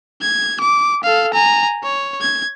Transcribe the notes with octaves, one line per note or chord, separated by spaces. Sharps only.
G#6
D6
A4 F5
G#5 A#5
C#5
G#6